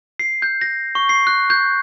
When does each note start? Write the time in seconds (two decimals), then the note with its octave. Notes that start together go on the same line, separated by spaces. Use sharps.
0.19 C7
0.42 G6
0.61 A#6
0.95 C#6
1.09 C7
1.27 F#6
1.50 G6